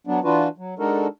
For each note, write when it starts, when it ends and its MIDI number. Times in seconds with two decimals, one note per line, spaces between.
0.07 0.20 54
0.07 0.20 59
0.07 0.20 62
0.24 0.48 52
0.24 0.48 62
0.24 0.48 65
0.24 0.48 66
0.24 0.48 71
0.58 0.74 54
0.79 1.07 56
0.79 1.07 62
0.79 1.07 63
0.79 1.07 66
0.79 1.07 69
0.79 1.07 70